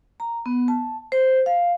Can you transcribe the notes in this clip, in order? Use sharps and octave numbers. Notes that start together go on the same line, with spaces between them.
A#5
B3
A5
C5
F5